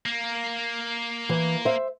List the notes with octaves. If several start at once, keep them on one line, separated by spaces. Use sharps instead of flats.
A#3
E3
C5 E5